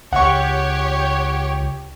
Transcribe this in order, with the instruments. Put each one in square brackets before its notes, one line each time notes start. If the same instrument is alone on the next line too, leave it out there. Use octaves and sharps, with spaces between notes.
[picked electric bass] C#2 [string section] G4 C#5 [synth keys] F#5 C#6